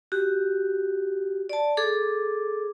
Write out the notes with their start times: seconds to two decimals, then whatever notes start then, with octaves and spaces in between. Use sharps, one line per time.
0.12 F#4 G4
1.49 D5 A5
1.77 G#4 A4 D6